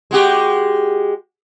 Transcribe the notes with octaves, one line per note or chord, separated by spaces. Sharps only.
G#3 F#4 G4